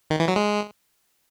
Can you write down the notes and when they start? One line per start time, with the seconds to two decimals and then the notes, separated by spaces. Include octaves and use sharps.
0.10 D#3
0.20 E3
0.28 F#3
0.36 G#3